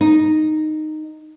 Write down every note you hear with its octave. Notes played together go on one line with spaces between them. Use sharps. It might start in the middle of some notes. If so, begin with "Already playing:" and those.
D#4